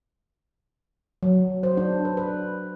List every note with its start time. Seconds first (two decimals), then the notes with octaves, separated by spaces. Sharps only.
1.23 F#3
1.63 C5
1.77 D4
2.05 B4
2.17 B4